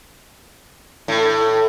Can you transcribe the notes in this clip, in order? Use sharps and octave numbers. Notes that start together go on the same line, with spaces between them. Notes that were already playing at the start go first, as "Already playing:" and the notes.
A2